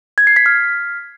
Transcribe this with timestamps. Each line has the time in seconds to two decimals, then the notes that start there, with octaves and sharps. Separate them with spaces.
0.18 G#6
0.27 C7
0.36 B6
0.46 F6